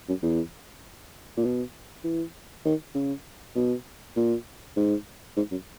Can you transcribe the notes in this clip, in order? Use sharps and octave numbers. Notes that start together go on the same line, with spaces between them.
F#2
E2
A#2
B2
E3
D#3
C#3
B2
A#2
G#2
G#2
F#2